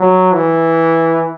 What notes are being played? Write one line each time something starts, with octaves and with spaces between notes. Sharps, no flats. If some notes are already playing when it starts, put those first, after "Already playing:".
Already playing: F#3
E3